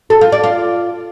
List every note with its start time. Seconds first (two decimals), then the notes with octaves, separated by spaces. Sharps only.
0.10 A4
0.21 F4
0.32 D5
0.43 F4